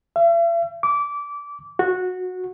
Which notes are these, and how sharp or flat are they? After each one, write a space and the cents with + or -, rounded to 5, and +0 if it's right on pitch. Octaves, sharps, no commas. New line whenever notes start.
E5 +45
D6 -20
F#4 -15